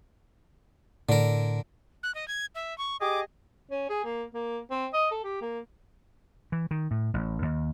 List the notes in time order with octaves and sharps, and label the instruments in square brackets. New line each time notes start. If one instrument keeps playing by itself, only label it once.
[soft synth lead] A2 [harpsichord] D3 A#4
[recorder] F#6
D#5
G#6
E5
C#6
[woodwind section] G4 G#4 D#5 [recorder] D6
[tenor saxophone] C#4
G#4
A#3
A#3
C4
D#5
A4
G4
A#3
[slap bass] E3
D#3
A2
A1
D#2